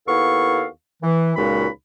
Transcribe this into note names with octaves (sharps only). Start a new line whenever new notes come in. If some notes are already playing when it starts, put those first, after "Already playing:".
D#2 B3 E4 A4 F5 C#6
E3
C#2 A#2 G#3 D#4 F#4 B5